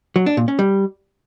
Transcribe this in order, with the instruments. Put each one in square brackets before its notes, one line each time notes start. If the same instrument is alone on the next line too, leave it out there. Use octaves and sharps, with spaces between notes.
[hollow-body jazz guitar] F#3
D4
A#2
C#4
G3